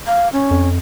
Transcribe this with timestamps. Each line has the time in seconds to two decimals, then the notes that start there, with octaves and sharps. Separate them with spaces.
0.07 F5
0.33 C#4
0.51 F2